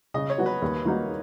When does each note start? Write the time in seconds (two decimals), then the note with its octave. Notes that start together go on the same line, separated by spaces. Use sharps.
0.14 C#3 D#5
0.30 C#5
0.38 F#3 B3 F#4
0.46 B4
0.62 D#2
0.85 D#3 A#3 D#4 F#4